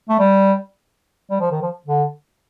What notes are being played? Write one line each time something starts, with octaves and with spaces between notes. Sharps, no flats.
A3
G3
G3
F3
D#3
F3
D3